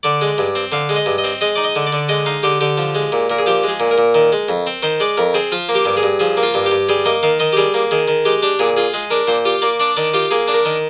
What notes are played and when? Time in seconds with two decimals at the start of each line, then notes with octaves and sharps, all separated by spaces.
0.03 D3 D5
0.21 G#3
0.38 G2
0.55 C4
0.72 D3 F5
0.89 G#3
0.96 D#5
1.06 G2
1.18 D#5
1.24 C4
1.41 G#3 D#5
1.56 D#4 D5
1.64 D#5
1.76 D3
1.87 D5
1.93 D3
2.09 G#3 D#5
2.26 D#4 F5
2.43 D3 G4
2.61 D3 G4
2.78 F3
2.95 G#3
3.12 A#2
3.30 A#2 A#4
3.38 G#4
3.46 F3 G4
3.64 G#3 G#4
3.80 A#2
3.91 A#4
3.98 A#2
4.15 D#3
4.32 G#3
4.49 F2
4.67 C4
4.83 D#3 C5
5.00 G#3 D5
5.17 F2 A#4
5.34 C4 G#4
5.52 F3 F4
5.69 A#3
5.75 G4
5.85 G2
5.97 G#4
6.03 G2
6.19 F3 G#4
6.37 A#3
6.43 F4
6.54 G2
6.66 G4
6.71 G2
6.89 G3 G#4
7.05 A#3 D#5
7.23 D#3 F5
7.39 D#3 D#5
7.53 G4
7.57 G3 G#4
7.74 A#3
7.91 D#3 G#4
8.08 D#3
8.25 G#3 G4
8.43 D4 G4
8.59 A#2 G#4
8.77 F4 G#4
8.93 G#3 G#4
9.10 D4 A#4
9.28 A#2 C5
9.45 F4 G4
9.62 A#3 D5
9.80 D4 D5
9.96 D#3 D5
10.14 F4 G4
10.31 A#3 G#4
10.48 D4
10.54 A#4
10.65 D#3